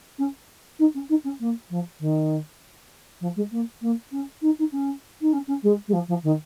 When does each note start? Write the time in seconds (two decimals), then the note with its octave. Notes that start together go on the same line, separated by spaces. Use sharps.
0.18 C#4
0.79 D#4
0.94 C#4
1.09 D#4
1.24 C#4
1.40 A#3
1.70 F3
2.00 D#3
3.21 F3
3.36 G#3
3.51 A#3
3.81 A#3
4.11 C#4
4.41 D#4
4.59 D#4
4.72 C#4
5.21 D#4
5.33 C#4
5.47 C#4
5.63 G#3
5.88 G#3
5.93 F3
6.08 F3
6.23 D#3